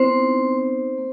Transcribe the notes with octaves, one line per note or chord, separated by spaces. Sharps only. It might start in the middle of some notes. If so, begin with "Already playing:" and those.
Already playing: B3 C4 E4 C5
D#4
C4
A#3